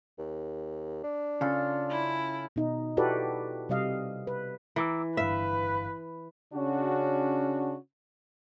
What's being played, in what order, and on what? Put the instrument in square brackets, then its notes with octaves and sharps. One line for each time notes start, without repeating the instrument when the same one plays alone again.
[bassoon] D#2
D4
[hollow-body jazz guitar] C#3 [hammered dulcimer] C#4 F4 A4
[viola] E4
[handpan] B2 D#4
E4 F#4 G4 A4 B4 D5
C3 G3 D#5 F5
B4
[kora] E3 [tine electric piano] A#5 D6 E6
[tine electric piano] G1 G2 F5 [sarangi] B4 [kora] E5
[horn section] C#3 C#4 D4 F#4